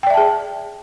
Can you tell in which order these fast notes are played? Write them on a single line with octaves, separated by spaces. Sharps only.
G5 D5 E5 A5 G#4